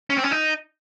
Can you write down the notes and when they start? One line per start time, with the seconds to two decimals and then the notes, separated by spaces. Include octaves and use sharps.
0.10 C#4
0.17 C4
0.24 C#4
0.31 D#4